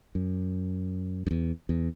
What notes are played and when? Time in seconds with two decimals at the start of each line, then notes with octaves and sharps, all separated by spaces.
0.15 F#2
1.27 F#2
1.31 E2
1.69 E2